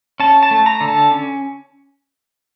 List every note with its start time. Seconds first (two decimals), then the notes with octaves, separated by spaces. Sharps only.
0.20 C#4 A5
0.43 A5
0.51 A3
0.66 A#5
0.81 D3
0.88 A5
1.11 C#4